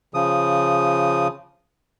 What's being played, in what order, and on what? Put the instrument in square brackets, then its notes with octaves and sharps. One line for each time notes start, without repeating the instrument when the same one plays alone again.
[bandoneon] C#3 F3 D#6